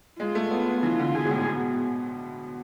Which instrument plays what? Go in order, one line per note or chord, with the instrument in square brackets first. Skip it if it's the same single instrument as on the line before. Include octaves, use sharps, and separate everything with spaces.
[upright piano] G#3 [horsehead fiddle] F4
[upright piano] A3
B3
B3
[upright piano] E3 [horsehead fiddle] F4
[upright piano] D3
[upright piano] B2 [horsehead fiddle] G#4
[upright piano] G#2
A2
B2